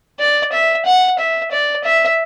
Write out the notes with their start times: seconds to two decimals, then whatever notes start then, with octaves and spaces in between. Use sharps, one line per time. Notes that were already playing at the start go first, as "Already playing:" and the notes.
0.20 D5
0.52 E5
0.86 F#5
1.19 E5
1.52 D5
1.84 E5